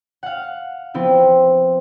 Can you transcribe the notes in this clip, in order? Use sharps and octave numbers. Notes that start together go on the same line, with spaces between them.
F5 F#5
F3 B3 C4 E4